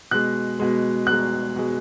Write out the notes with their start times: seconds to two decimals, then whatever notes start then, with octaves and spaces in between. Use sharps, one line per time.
0.11 B2 G#3 F#6
0.59 B2 G#3
1.07 B2 G#3 F#6
1.56 B2 G#3